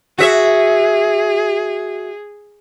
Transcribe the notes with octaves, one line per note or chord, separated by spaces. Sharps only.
F#4 G#4 E5